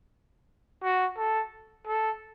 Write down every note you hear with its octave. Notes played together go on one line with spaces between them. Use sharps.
F#4
A4
A4